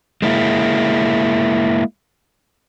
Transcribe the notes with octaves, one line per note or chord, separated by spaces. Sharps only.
G#3 A#3 E4